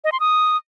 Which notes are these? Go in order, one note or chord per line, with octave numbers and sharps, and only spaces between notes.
D#5
C6
D#6